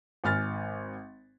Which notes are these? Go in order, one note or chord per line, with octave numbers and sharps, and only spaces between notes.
G#1 G#5 F6 A6